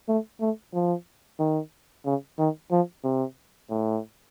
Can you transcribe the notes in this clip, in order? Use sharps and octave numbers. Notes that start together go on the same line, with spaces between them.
A3
A3
F3
D#3
C#3
D#3
F3
C3
A2